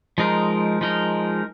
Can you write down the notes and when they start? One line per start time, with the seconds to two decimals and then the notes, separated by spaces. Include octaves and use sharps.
0.18 F3 G#3 D#4 A#4
0.81 F3 G#3 D#4 A#4